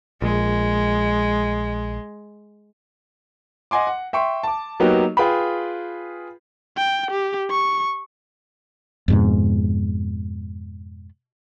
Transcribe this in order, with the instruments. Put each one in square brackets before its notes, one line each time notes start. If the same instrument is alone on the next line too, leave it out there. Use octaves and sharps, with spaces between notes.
[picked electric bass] A#1 [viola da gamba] G#3
[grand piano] D#5 F#5 G#5 C6 D6
F#5
E5 G5 C6 C#6
A5 D6
F#3 A#3 B3 D#4 F#4 G4
F4 G#4 B4 G5 B5
[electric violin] G5
G4
C#6
[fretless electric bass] F2 G#2 B2